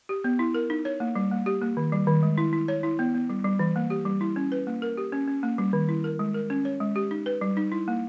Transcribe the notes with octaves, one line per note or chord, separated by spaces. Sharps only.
G4
B3
E4
A#4
D#4
C#5
A#3
G3
A#3
G4
A#3
D#3
G3
D#3
G#3
E4
E4
C#5
E4
B3
B3
G3
G3
E3
A#3
G4
G3
E4
C#4
B4
A#3
A#4
G4
C#4
C#4
A#3
G3
D#3
E4
A#4
G#3
A#4
C#4
C#5
G#3
G4
D#4
B4
G3
D#4
E4
A#3